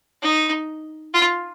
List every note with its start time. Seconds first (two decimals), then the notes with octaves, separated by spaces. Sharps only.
0.23 D#4
1.14 F4